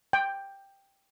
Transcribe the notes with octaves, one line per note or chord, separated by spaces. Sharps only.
G5